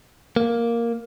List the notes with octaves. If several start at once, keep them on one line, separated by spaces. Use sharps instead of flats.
A#3